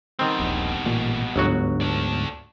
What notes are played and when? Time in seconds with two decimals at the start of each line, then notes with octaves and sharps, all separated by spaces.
0.19 B2 D#3 G3 C4
0.40 D#1 A#1
0.84 A1 A#2
1.36 G1 D2 G#2 F#3 B3 F#4
1.81 A3 D5